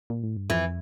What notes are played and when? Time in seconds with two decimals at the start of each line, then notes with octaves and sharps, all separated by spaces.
0.10 A#2
0.23 A2
0.37 G2
0.50 F2 E3